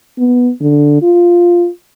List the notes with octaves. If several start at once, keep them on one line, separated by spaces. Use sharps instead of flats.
B3
D3
F4